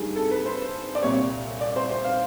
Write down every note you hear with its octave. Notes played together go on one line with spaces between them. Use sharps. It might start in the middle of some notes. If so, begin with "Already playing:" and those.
Already playing: G2 D#3 G3 G#4
A4
B4
C5
D5
C2 A#2 G3 C4 C#5
D5
C5
C5
F5